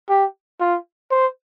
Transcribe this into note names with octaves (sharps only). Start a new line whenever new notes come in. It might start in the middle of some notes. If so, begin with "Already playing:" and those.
G4
F4
C5